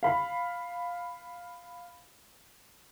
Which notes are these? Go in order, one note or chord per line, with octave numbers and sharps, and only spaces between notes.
F5 B5